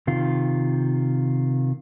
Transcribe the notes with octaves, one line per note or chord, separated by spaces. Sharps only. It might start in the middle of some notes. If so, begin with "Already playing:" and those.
C3 D#3 F4